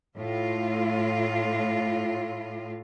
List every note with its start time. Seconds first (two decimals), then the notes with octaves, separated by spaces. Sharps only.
0.17 A2 F4